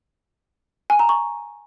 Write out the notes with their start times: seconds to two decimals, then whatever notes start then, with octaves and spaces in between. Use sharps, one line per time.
0.90 G#5
0.99 A#5
1.09 C#6